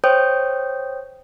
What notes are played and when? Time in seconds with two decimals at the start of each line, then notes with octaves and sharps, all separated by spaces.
0.04 C5 C#5 G5 D#6 G6